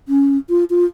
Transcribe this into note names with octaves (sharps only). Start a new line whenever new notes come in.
C#4
F4
F4